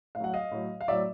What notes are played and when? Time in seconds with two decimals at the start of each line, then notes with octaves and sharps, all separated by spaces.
0.15 A2 F5
0.20 F#3 F#5
0.34 D#5 F5
0.51 A2 F#3
0.81 F5
0.88 A2 F#3 D5 E5